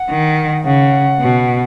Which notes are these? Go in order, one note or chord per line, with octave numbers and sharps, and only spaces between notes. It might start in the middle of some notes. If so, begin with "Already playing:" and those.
Already playing: F#5
D#3
C#3 F#5
B2